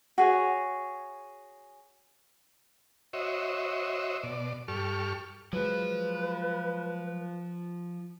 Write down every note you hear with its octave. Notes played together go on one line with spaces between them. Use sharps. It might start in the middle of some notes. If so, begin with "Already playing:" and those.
F#4 G#4 C#5
F#4 C5 C#5 D#5 E5
B2 D5
G2 G4 A4 C#6 F6
F3 F#3 G#3 B4